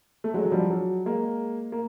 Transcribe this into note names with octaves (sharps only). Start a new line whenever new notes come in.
A3
F#3 G#3
F#3
F3 G3
F#3
G#3 A#3
A#3